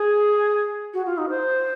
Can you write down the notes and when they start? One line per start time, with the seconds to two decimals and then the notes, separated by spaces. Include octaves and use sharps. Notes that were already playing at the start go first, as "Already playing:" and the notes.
Already playing: G#4
0.94 F#4
1.06 F4
1.18 D#4
1.30 C5